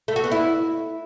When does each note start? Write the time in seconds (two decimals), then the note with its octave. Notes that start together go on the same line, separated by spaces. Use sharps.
0.08 A3
0.16 F#4
0.24 B3
0.32 E4